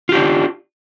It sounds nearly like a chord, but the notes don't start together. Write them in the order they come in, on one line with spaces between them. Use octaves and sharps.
F4 G4 D4